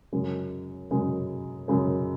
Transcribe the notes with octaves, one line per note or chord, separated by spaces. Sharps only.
F#2 C#3 G#3
F#2 C#3 G#3
F#2 C#3 G#3